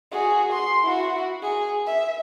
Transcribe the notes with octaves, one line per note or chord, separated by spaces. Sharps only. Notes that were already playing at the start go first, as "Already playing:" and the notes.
F#4 G#4
C6
E4 F#4
G#4
E5